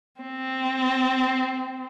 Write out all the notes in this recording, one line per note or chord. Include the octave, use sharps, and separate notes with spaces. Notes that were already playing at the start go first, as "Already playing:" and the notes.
C4